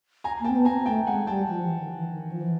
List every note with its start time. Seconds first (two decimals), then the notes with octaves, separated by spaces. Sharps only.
0.24 G#5 A#5
0.40 A#3 G5 A5
0.49 C4
0.55 B3
0.65 G#5 A#5
0.71 C4
0.86 A3 G5 A5
1.06 G#3 F#5 G#5
1.27 G3 G5 A5
1.48 F3
1.63 E3
1.79 D#3
1.94 E3
2.10 D#3
2.32 F3
2.41 E3